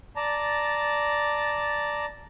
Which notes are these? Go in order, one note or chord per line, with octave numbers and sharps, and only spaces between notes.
D5 A5 A#5